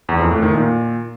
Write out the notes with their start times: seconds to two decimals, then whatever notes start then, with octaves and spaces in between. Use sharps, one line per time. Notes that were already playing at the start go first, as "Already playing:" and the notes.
0.09 E2
0.20 F2
0.31 A2
0.42 D#3
0.53 A#2